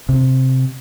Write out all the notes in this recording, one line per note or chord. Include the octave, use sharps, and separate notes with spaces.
C3